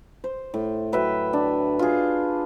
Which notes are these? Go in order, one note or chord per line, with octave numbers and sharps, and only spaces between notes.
C5
A2
F#3 B4 E5 G5
D4
F4 G#4